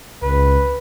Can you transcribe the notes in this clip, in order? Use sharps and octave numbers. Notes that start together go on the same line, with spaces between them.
C#2 B4